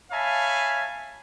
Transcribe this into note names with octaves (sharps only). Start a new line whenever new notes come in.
C#5 E5 F5 G#5 A5 B5